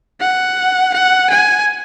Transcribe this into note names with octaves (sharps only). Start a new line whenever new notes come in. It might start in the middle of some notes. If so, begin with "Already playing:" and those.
F#5
F#5
G#5